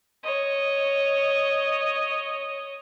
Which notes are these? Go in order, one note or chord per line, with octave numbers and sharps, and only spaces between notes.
C#5 D#5